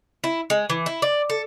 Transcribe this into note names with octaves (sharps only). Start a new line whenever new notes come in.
E4
G#3
E3
E4
D5
A4